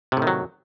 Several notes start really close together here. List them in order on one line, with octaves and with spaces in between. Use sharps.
C3 A2 D#3 F#3